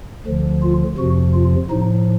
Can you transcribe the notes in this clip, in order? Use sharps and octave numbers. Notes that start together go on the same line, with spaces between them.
D2 D3 F3
F4
F2 C3 F3 F#4
F4
A2 F3 D#4